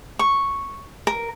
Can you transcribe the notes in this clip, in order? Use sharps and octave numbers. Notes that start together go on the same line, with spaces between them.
C#6
A#4